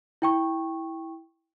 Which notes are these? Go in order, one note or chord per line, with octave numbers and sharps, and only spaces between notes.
E4 G5 C#6